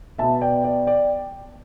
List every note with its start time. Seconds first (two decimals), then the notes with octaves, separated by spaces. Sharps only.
0.18 B2 B3 E5 A5
0.41 D5 G5
0.64 D5
0.87 D5 G5